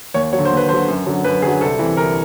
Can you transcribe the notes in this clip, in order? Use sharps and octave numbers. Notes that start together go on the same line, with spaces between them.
D#2 C#5
F#3 C#5
D3
C5
D#2
B4
D3 F#3 C5
F#2
D3 F#3
F#2 B4
D3 F#3 G#4
C2 A4
C3 E3
C2 A#4